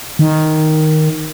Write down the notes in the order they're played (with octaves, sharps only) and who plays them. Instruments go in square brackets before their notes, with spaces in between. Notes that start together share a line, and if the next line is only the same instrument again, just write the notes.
[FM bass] D#3